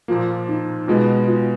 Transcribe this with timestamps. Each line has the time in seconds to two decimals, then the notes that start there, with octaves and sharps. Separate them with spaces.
0.08 A#2 F3 A#3 F4
0.48 D#4
0.87 B2 G#3 B3 F4
1.27 F4